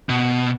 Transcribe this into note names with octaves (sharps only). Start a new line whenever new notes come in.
B2